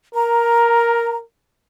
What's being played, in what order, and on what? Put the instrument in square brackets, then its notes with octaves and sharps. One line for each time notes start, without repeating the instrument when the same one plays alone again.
[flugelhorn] A#4 [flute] A#5